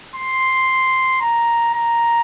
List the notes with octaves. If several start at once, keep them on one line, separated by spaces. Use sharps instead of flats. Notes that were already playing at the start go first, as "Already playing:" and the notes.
C6
A#5
A#5